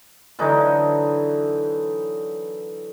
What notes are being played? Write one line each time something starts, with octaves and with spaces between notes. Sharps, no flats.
D3 E3 F#3 D#4